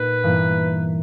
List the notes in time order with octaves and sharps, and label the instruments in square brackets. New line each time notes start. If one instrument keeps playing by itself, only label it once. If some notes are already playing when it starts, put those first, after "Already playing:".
Already playing: [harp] A#2 B3 D#4 [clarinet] B4
[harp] G2 E3 A#3